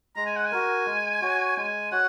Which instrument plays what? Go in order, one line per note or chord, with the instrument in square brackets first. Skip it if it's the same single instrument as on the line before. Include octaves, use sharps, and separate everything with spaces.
[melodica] G#3 [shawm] A#5
[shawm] G#5
F#5
G#5
[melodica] F#4 A#4
G#3
F#4 C#5
[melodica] G#3 [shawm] G#5
[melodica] F#4 C#5 [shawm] F#5